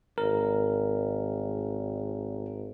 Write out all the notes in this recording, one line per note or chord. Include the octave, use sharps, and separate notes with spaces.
G#1 A#4